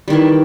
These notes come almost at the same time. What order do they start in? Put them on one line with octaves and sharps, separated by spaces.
G3 D#3 E3